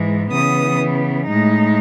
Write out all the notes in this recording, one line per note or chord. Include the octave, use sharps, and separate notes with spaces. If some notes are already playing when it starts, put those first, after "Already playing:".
Already playing: G#2 E3 G#3
C#3 E3 B3 D#6
A2 G#3 D#4